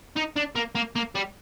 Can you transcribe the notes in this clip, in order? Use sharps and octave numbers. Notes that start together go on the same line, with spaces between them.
D#4
D4
A#3
A#3
A#3
G3